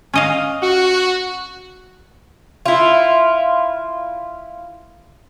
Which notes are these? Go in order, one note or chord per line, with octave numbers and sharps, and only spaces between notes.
C#4 D#5 F5
F#4
E4 F4